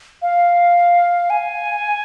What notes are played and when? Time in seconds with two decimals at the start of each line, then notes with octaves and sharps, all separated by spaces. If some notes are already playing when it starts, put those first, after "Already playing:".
0.22 F5
1.30 G#5